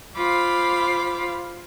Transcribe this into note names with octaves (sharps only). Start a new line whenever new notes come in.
F4 C5 F5 B5 D6